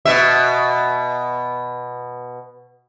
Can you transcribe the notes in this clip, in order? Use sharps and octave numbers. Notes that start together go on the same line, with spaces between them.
B2 E5